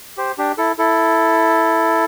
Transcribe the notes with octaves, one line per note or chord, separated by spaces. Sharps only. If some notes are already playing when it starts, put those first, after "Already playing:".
G4 C5
D4 G4
E4 A4
E4 A4